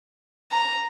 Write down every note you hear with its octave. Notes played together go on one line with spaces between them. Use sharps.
A#5